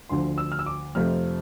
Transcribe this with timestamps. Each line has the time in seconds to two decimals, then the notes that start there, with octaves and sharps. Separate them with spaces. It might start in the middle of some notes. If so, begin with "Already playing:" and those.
0.09 D2 D3 F3 C6
0.38 E6
0.52 F6
0.59 E6
0.66 D6
0.95 F2 C3 F3 A3 C4 F6